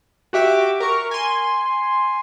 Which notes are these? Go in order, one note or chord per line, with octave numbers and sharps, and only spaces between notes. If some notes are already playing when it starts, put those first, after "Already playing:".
F#4 G4 E5 D6
A#4 C#6
G#5 C6